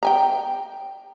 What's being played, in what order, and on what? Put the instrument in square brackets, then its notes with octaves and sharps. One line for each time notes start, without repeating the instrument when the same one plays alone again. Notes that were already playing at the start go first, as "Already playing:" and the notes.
[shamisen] G5 G#5 A#5